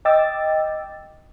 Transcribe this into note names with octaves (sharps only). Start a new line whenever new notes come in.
D#5 G5 D6 E6 A6